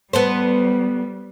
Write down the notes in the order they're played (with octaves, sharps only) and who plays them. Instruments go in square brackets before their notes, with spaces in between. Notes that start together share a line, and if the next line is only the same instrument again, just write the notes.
[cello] G3 [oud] B3 A4 C5